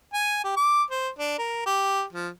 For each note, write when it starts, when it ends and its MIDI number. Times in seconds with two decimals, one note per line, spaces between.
0.14 0.43 80
0.44 0.53 67
0.57 0.83 86
0.91 1.09 72
1.19 1.38 62
1.38 1.64 70
1.66 2.04 67
2.13 2.29 53